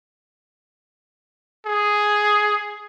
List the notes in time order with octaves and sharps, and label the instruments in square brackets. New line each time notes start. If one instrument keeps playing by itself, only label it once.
[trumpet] G#4